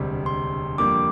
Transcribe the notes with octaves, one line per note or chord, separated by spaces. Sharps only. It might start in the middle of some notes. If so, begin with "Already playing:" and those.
Already playing: E1 D2 C3 G3
C6
F2 D3 G3 A#3 D6